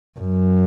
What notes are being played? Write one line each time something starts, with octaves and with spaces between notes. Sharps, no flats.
F#2